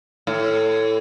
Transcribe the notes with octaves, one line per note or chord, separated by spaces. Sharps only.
A2